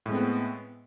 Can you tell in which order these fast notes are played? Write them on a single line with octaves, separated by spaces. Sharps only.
A2 G#3 C4 B3